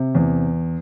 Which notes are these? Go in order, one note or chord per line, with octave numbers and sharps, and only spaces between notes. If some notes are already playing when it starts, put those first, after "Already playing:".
Already playing: C3
E2